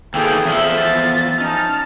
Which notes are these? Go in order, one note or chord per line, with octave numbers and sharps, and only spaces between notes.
G#1 D#2 E3 G#4 A4 G5
E2 F3 E5
B3 A6
C#4 D#4 A5 F6